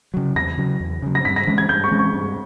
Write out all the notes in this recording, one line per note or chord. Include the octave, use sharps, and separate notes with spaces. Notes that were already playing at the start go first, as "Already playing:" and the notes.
C#3 F#3
E2 A#6
C#3 F#3
E2
C#3 F#3
A#6
G2 B6
A#6
E3 G#3 C#4
G#6
G2 G6
C#6
E3 G#3 C#4
C#6
G2